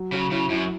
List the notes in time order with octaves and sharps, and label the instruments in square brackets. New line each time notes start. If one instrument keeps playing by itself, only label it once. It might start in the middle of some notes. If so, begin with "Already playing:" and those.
Already playing: [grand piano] F#3
[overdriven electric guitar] C#3 [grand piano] F#3
[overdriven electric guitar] C#3 [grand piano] E4
[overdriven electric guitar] F#2 [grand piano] E4